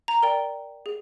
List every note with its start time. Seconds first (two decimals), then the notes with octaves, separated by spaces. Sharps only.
0.08 A#5
0.23 A#4 D5 G5
0.86 G#4